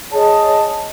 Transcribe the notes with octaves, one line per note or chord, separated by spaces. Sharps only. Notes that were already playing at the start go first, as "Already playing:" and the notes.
G#4 C#5 D#5 A5